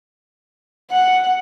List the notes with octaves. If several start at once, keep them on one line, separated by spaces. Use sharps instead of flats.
F#5